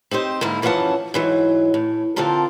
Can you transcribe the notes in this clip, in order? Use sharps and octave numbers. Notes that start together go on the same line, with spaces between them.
C4 D#4 G4 C5
G#2 D3 A#3 E4
F#2 E3 F3 C#4 F#5 A5
G#2 E3 F#3
A2
D3 F3 C4 F4 A4 A#4